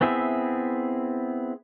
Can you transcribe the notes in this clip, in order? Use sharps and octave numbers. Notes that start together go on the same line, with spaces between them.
B3 C4 E4 G#4 E5